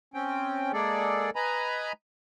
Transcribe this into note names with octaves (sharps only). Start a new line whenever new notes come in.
C4 C#4 G5
G#3 A#3 G#4 A4 D5
B4 D#5 G#5 A#5 B5